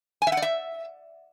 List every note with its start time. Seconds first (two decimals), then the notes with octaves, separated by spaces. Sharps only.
0.22 G#5
0.27 E5
0.32 F#5
0.37 D5
0.42 E5